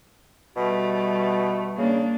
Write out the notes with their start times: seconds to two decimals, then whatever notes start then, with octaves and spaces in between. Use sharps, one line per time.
0.56 B2 G3 A3
1.78 C#3 A#3 D4